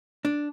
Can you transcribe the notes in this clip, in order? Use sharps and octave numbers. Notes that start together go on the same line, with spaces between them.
D4